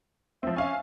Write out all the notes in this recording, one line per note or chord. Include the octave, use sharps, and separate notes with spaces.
F3 C4 E5
C#4 E5 F5 G#5